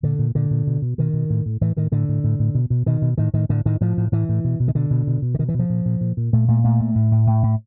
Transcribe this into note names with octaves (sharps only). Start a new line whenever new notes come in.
A#2 D3
A#2
A#2 D3
A#2
B2
B2
B2 D#3
B2
A2
A2
A2 E3
A2 D#3
A2 D3
A2
A2
A2
B2
B2
B2 D#3
B2
A2 D#3
A2 D#3
A2 D3
A2 D#3
A2 F3
A2
A2 E3
A2
B2
B2
D#3
B2 D3
B2
B2
B2
D3
B2 D#3
E3
B2
F3
A#2
A#2
A#2
A#2
A#2 A3
A#2 A3
A#2 A3
A#2
A2
A2
A2
A2